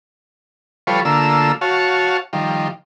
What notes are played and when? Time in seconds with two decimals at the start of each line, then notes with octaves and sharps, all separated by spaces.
0.87 F3 G3 F4 A4 B4 C#5
1.05 D3 A3 A#3 F4 E6
1.61 F#4 C#5 F5 A5
2.33 D#3 F3 G3